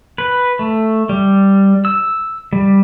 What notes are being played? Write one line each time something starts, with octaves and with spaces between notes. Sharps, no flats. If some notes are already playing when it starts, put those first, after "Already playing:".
B4
A3
G3
E6
G3